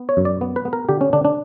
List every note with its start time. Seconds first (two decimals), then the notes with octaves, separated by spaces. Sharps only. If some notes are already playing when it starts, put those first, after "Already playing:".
Already playing: B3
0.09 C#5
0.17 F#2
0.25 D5
0.41 B3
0.56 B4
0.65 B3
0.73 A#4
0.89 D3 G4
1.01 C#4
1.13 D3 D4
1.25 D4